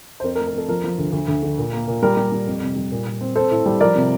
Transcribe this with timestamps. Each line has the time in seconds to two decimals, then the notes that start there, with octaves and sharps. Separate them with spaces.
0.20 C5
0.23 F2 A#4
0.35 A#4
0.39 A3
0.47 A#4
0.54 F2 A4
0.68 F3 A#4
0.84 F3
0.98 D2
1.13 D2
1.28 D2
1.43 D3
1.58 A#2
1.73 A#3
1.88 A#2
2.02 G3 A#4
2.17 G3
2.32 G3
2.47 F2
2.62 C3
2.76 G3
2.92 A#2
3.06 A#2
3.21 C4
3.36 C4 A4 C5
3.51 A2
3.66 G3
3.81 F3 A#4 D5
3.95 C3